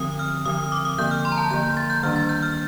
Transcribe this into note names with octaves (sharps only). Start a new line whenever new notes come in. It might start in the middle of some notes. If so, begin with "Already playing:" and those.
Already playing: D3 F3 C4 D#6
F6
D3 F3 C4 D#6
D#6
D6
D#6
D3 F3 A#3 G6
F6
C6
A#5
A5
D3 F3 A#3 G6
G6
A6
G6
D#3 G3 A#3 D4 F6
A6
G6
F6